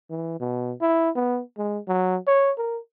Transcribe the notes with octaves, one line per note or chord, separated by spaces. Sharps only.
E3
B2
E4
B3
G#3
F#3
C#5
A#4